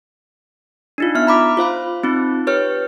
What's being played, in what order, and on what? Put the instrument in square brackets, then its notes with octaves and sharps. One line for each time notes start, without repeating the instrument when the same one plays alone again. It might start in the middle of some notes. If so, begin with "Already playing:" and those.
[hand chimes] D4 D#4 F4
B3 E5 F6
A#5 B5 D6 B6
F4 C5 F5 B5
C4 D#4 F4
G4 B4 C#5 F6